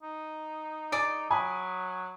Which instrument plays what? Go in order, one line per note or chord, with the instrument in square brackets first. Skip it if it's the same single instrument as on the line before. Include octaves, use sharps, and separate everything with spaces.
[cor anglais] D#4
[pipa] G#4 D5 [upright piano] D7
[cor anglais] F#3 [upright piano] G#5 B5 D#6